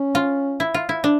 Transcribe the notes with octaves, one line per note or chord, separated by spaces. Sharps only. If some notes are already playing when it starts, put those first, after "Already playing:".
Already playing: C#4
F4
E4
F4
E4
D4